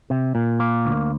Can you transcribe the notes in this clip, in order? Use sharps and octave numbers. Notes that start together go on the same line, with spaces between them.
C3
A#2
A#3
D2